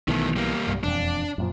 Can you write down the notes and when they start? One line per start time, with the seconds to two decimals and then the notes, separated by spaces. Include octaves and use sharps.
0.08 B1 B2 D#3 E3 A3
0.36 G3 A#3
0.67 C2 G2
0.83 E1 F2 D4
1.38 F#2 A#2 F3